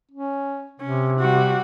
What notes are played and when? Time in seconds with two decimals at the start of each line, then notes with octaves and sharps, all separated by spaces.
0.11 C#4
0.80 C3 C#4
1.20 G3 F#4